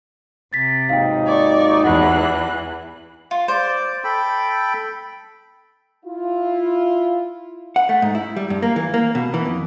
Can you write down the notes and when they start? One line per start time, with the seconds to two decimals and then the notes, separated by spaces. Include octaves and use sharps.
0.53 C3 A6 B6
0.89 G#1 D#2 D#4 F5 G5
1.26 D5 C#6
1.84 E2 E3 F#5 F#6
3.31 F4
3.48 C5 D5
4.04 A4 G5 B5
6.05 E4 F4
7.76 F#5
7.89 A3
8.02 G#2
8.15 E4
8.37 G3
8.50 G2
8.62 A#3
8.76 E3
8.94 A#3
9.15 B2
9.34 E3
9.45 F2